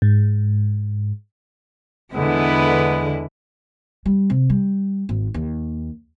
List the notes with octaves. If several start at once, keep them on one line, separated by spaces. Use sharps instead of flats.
G#2
E2 D3 G#3 B3 E4 B4
G3
C3
G3
G#1
D#2